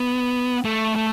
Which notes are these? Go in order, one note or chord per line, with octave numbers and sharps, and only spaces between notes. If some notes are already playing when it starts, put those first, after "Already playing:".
Already playing: B3
A3
A3